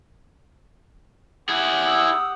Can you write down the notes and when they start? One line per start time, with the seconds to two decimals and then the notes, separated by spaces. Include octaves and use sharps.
1.49 E4 G4 G#4 F#5
1.86 D#6 E6